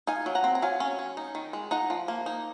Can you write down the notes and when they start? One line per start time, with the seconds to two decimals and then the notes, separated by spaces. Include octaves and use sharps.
0.07 D#4 F5 G#5
0.26 F#3
0.35 F#5 A#5
0.44 C4
0.55 A#5
0.62 F#3 F5 G#5
0.80 C#4
0.99 C#4
1.17 D#4
1.35 D#3
1.53 G#3
1.71 D#4 F#5 A#5
1.90 F3
2.08 A#3
2.26 D#4